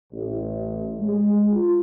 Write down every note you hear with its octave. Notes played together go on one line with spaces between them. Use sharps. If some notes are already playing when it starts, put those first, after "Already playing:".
A1
G#3
F4